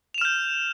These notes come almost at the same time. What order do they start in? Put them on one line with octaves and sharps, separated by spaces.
F7 E7 F6 G6